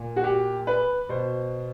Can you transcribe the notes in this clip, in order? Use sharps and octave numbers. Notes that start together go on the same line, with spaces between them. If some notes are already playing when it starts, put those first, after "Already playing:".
Already playing: A#2
F#4
G4
B4
B2 C5